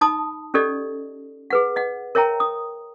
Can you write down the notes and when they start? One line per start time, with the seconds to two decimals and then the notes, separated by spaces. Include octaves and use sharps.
0.01 D#4 A5 B5 D#6
0.54 C#4 G4 A4 D5 D#5
1.50 G#4 B4 F#5
1.76 D#5 F#5
2.15 A#4 C#5 E5 G5 A#5
2.40 D#6